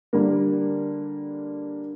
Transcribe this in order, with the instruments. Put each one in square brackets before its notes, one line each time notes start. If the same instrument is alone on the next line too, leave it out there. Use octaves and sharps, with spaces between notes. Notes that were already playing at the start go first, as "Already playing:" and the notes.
[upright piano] D3 G3 A#3